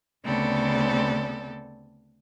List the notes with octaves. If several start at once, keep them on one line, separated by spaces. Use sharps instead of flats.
D2 C#3 B3 C4 A4 D5